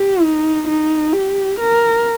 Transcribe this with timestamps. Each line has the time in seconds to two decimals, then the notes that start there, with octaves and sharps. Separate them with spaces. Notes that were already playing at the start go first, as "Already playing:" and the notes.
Already playing: G4
0.23 D#4
0.68 D#4
1.13 G4
1.59 A#4